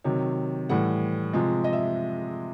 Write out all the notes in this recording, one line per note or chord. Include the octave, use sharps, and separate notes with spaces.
C3 D#3 F#3 C#5
A2 E3 G3 F#5
C3 F3 G#3
D#5
E5